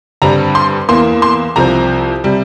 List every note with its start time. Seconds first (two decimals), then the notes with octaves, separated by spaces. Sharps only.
0.22 G2 D3 G3 C4 A#5
0.55 C6
0.89 E2 E3 A#3 C6
1.22 C6
1.56 C2 C3 F3 C4 A#5
2.24 C3 G3